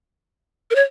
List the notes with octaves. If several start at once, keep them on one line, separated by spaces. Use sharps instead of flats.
A#4
C#5